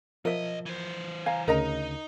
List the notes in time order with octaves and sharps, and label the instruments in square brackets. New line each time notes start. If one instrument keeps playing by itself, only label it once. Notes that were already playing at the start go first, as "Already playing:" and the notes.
[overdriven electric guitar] B1 D#5 [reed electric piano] F3 [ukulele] A#4 E5
[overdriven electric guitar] E3 C5
[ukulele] F5 [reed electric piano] G#5 A#5
[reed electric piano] D2 C#3 [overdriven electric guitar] D#4 [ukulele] A#4 D#5 A#5